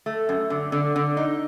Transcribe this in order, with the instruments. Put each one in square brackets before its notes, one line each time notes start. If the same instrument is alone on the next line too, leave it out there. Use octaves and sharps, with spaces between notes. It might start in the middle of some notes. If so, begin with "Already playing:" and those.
[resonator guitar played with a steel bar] A3
F#2
D3
D3
D3
D#4